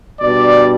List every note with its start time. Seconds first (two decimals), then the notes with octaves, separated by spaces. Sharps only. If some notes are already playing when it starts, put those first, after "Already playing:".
0.21 B2 G3 D4 D5